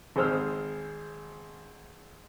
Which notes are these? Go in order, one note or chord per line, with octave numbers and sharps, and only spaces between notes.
G#1 G#4 C5 E6 F6